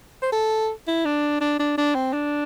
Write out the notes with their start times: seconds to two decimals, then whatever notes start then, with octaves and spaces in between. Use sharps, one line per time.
0.22 C5
0.32 A4
0.88 E4
1.05 D4
1.41 D4
1.59 D4
1.78 D4
1.95 C4
2.13 D4